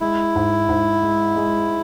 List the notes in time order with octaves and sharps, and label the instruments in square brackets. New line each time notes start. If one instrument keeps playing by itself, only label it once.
[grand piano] G#3 [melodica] E4
[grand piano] G#2
G#2
G#3
G#3